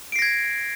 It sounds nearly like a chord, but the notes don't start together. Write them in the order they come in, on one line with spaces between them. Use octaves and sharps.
D7 C7 A#6 G#6